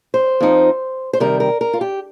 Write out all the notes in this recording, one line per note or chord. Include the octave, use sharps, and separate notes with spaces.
C5
F2 F3 D#4
C5
C3 D#3 G3 A#4
A#4
A#4
F4
G4